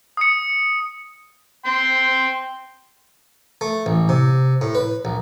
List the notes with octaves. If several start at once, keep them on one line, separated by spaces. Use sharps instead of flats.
D#6 C#7
G5 C6
A3
A1
C3
A2
B4
A#1